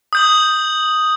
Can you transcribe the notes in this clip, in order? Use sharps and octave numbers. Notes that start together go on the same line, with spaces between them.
D#6 G6 F#7